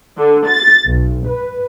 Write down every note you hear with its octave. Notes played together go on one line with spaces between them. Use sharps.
D3
A6
B1
B4